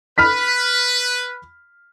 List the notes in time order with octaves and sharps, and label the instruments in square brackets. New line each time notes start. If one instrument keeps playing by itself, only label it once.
[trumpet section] B4 [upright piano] B5 F6 B6